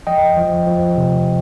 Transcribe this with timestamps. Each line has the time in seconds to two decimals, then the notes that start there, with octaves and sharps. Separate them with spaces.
0.07 F3 D#5 G5
0.37 F3
0.67 F3
0.97 C3